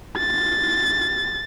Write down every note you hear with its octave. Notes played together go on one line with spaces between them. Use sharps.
A6